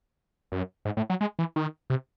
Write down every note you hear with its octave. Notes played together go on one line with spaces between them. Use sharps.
F#2
G#2
A2
F#3
G#3
E3
D#3
C3